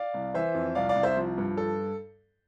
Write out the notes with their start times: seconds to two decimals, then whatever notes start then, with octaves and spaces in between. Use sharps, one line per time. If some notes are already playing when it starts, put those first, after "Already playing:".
Already playing: D5 F5
0.14 C2
0.34 E3 C5 E5
0.54 F2
0.75 C2 D5 F5
0.89 D5 F5
0.96 C2
1.03 C5 E5
1.17 F3
1.38 G2
1.57 A4